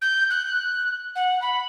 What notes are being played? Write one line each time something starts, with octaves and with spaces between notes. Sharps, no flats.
G6
F#6
F#5
B5